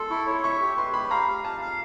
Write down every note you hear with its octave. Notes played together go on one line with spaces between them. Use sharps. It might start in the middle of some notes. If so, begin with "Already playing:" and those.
Already playing: A4 C6
E4 C#6
C#5
E5 C#6
G4
B4 C6
G4 B5
F5 A#5
F5
F5 A5
F5